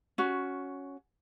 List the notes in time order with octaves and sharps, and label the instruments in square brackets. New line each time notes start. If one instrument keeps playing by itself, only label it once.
[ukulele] C#4 F#4